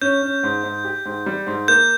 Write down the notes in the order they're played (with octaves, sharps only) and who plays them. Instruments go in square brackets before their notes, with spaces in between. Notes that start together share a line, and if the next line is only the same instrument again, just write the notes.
[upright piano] C#4 [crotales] G6
[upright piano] C#4
G#2
G#2
G4
G#2
G3
G#2
[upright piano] A#3 [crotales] G6